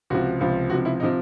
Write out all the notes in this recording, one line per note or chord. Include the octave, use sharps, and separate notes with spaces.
C#2 C3 F3 F#4
C#2 C3 F3
C#2 C3 F3 F#4
E4
C3 F3 D#4